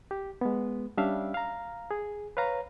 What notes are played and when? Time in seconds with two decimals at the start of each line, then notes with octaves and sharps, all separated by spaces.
0.11 G4
0.41 G#3 B3
0.97 G3 C#4 D4 E5 F5
1.34 F5 A#5
1.91 G#4
2.37 B4 C#5 F5 A#5